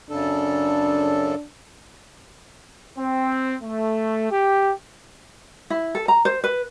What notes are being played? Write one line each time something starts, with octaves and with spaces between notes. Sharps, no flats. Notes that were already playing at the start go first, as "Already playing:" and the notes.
F#2 C#3 D4 A4
C4
A3
G4
E4
A4
A#5
C5
B4